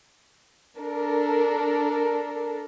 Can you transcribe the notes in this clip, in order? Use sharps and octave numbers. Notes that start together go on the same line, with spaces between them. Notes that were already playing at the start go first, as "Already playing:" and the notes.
D4 A4 A#4